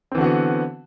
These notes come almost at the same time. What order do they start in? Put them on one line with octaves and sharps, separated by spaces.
C4 E3 D3 F#4 B3